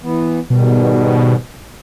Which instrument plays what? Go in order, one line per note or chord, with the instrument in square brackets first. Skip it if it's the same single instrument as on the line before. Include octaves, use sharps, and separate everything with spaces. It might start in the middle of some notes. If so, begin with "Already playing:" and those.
[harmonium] E3 B3
[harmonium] G#2 D#3 G3 [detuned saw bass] B2